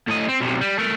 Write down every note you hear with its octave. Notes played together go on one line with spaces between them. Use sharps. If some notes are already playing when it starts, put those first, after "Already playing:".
A2 D#5
C4
B1 C3
G3
A3 A#4